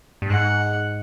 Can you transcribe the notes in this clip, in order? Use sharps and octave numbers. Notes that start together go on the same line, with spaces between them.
G2
G#2 F#5